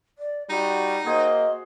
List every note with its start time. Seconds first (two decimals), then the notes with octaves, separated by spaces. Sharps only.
0.18 D5
0.50 G3 D#4 F#4
1.05 A#3 F#4 G#4 C5 D#5